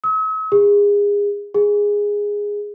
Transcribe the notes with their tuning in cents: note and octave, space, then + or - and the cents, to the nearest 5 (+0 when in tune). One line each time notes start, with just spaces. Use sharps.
E6 -45
G#4 -30
G#4 -10